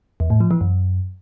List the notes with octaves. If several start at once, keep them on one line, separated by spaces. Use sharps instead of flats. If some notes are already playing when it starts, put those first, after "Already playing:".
E2
A2
F3
E3
F#2